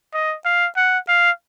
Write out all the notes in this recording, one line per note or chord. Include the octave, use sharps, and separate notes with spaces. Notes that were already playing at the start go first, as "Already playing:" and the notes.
D#5
F5
F#5
F5